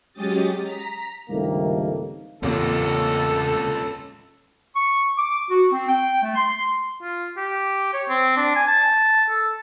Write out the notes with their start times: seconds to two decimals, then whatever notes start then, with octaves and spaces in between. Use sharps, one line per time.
0.13 F#3 G#3 C#4 G4 D#6 A6
0.61 A#5 B6
1.30 C#2 G2 C3 D#3 A3 A#3
2.43 A1 E2 A#2 C#3 C4 C#4 F4 A4
4.75 C#6
5.17 D6
5.50 F#4
5.72 C4
5.88 G5
6.23 A3
6.35 C6
7.03 F4
7.37 G4
7.93 C#5
8.09 C4
8.37 D4
8.56 G#5
8.67 A5
9.29 A4